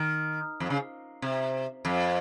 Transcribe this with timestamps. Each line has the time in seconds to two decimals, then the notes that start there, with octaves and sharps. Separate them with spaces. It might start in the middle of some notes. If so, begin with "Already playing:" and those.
Already playing: D#3
0.60 F2
0.70 C#3
1.22 C3
1.85 F2